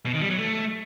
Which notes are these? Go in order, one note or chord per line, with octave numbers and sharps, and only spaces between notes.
B2
D#3
G3
F#3
A3